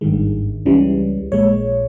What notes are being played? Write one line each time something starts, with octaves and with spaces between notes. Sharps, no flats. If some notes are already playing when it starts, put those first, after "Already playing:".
G#1 G2 D#3 G#3
C#2 C#3 E3 G3
A#1 A#2 G#3 C#5